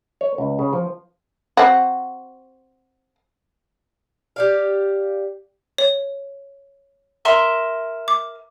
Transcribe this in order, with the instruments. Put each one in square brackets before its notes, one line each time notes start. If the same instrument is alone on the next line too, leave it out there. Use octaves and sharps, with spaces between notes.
[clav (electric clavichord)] C#5
C#2
C#3
F3
[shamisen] C4 F#4
[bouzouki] G4 D5 F5
[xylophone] C#5
[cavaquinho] A#4 E5 C6
[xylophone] D6